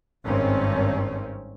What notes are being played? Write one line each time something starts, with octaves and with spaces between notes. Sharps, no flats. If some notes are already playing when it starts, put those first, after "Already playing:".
G#1 G2 D#3 C4 C#4